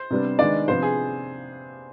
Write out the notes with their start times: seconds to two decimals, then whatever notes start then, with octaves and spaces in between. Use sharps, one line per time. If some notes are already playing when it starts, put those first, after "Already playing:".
Already playing: C5
0.11 C3 G3 B3 D4
0.39 D#3 G#3 B3 D4 D5
0.68 C3 F3 B3 D4 C5
0.82 G#4